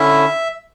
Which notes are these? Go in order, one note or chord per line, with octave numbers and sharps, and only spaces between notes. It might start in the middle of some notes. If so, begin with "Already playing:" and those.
Already playing: D3 C#4 E4 E5